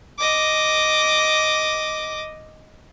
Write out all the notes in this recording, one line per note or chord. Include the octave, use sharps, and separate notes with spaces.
D#5 D6